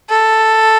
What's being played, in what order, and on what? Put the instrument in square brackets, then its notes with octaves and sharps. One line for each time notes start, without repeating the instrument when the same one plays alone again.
[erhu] A4